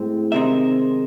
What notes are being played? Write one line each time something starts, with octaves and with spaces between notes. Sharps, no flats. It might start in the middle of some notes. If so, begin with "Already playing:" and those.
Already playing: A2 G#3 C4
C3 D#3 G#3 C4 D#4 E5